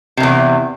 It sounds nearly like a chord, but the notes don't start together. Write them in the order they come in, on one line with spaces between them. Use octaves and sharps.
C3 G2 E2